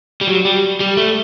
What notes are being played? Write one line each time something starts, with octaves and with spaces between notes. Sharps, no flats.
G3
F#3
G3
G3
A3